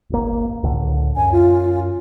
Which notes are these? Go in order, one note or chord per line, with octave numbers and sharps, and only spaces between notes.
D#1 G#1 A#3
C#2 A2 D3
F#2 G#5
F4